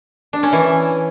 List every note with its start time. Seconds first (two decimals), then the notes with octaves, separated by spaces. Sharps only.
0.33 D4
0.43 C#4
0.53 E3